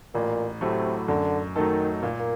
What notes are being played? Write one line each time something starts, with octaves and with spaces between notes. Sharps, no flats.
A1 A#2
A2 C3 F#3 A3
F#2 D3
D#3 F#3 A3 D#4 A4
A#2 A#3
A#3